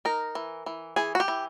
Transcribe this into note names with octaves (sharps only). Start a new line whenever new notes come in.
D#4 A#4
E3
E3
E3 G#4
F#4
G4
E3